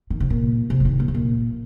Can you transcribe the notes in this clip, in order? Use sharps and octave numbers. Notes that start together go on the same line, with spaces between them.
D#3
C3
A#2
C3
F3
D#3
A#2
C3
A#2